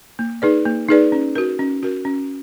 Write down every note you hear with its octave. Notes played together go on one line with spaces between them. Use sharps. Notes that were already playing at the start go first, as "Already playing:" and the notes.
A#3
D#4 G#4 B4 D5
A#3
D#4 G#4 B4 D5
C#4
F#4 A#4
C#4
F#4 A#4
C#4